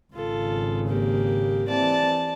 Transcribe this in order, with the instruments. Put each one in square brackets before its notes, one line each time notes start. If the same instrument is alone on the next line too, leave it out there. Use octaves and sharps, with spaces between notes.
[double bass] G#1 C#3 [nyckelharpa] F4 A4
[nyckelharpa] A#3 G4
[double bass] E3 C4 [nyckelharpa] D5 A5